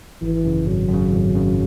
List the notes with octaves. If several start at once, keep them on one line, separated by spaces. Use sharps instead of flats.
G#1 E3
F#2 C#3
G#1 F#3
F#2
C#3
G#1
F#2 C#3